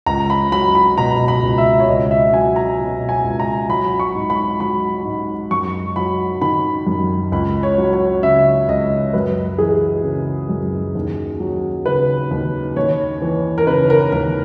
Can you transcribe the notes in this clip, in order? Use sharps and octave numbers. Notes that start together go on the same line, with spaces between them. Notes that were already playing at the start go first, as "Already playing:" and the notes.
C#2 A#5
B5
F#3 B5
B5
B2 A#5
B5
C#2
E5
C#5
C#2 D#5
E5
F#3 G#5
A#5
B2
G#5
C#2
A#5
F#3 B5
C#6
G#2
B5
F#3 B5
G#2
F#2 C#6
F#3 B5
D#3 B5
F#2
C#2 B5
C#5
F#3
C#5
C#3 E5
C#2 D#5
F#2 B4
E3 G#4
C#3
F#2
D#2
F#3
C#3 B4
D#2
D#2 C#5
E3
A#4
C#3 B4
A#4
D#2 A#4